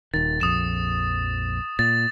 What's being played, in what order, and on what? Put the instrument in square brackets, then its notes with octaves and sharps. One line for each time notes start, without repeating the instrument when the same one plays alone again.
[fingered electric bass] D#1 D#3 [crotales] A6
[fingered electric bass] A#1 F2 [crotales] D#6 E7
[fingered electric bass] A#2 [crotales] A6